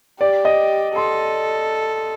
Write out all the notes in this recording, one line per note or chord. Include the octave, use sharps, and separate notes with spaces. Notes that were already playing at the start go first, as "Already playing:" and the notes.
G4 D5
D#5
A4 C6